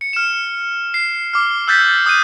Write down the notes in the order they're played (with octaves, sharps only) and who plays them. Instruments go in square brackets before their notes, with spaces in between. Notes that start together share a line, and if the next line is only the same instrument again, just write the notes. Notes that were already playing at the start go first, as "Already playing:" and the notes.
[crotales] C#7
F6 E7
C7
D6 F6
E6 F#6 G6 A6 B6
D#6 F#6 G6 D#7